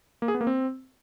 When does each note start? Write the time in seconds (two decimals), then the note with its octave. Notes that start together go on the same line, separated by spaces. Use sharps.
0.22 A#3
0.28 G#4
0.34 B3
0.41 A#3
0.47 C4